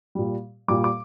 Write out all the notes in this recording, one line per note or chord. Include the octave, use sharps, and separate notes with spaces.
A#2 G3
A#2 G3 D6
D6